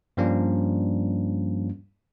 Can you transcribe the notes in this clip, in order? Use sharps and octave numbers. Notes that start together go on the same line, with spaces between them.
G2 F3 G3 A#3 C#4 D4